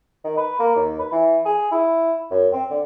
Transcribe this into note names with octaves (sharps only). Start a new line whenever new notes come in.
D#3
B4
A#3
D#2
B4
E3
G#4
E4
F#2
C4
D3